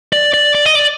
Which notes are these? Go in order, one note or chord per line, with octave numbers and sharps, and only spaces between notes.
D5
D5
D5
D#5
D5